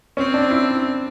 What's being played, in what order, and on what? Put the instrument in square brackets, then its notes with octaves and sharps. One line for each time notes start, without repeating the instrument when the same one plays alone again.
[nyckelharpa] C4 [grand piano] C#4
[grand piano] D4
E4